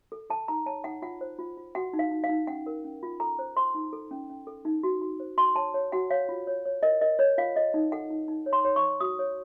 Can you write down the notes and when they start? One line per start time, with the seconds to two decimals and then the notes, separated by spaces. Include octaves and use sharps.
0.12 A4
0.30 A4 A5
0.48 D#4 A#5
0.66 C#5 A5
0.84 D#4 F#5
1.02 F4 F#5
1.21 C5
1.39 F4
1.57 F4
1.75 F#4 F#5
1.93 D#4
1.99 F5
2.11 D#4
2.24 F5
2.29 D#4
2.47 C#4 F#5
2.66 A#4
2.85 C#4
3.03 F4
3.20 A4 A#5
3.39 C5
3.56 C5 C6
3.74 D#4
3.93 A4
4.11 C#4
4.30 C#4
4.47 A4
4.65 D#4
4.83 F#4
5.02 F#4
5.20 C5
5.37 F#4 C6
5.56 C#5 A5
5.74 C#5
5.92 F#4 F#5
6.10 C#5 F5
6.29 F4
6.47 C#5
6.65 C#5
6.83 A#4 D#5
7.01 A#4 D#5
7.19 C#5
7.38 F4 F5
7.56 A4 D#5
7.74 D#4
7.92 A4 F#5
8.10 D#4
8.28 D#4
8.46 C#5
8.53 C6
8.65 C#5
8.76 C#6
8.82 C#5
9.00 F#4 D#6
9.19 C#5